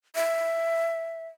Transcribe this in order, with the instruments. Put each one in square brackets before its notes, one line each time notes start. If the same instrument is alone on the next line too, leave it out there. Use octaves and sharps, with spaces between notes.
[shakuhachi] E5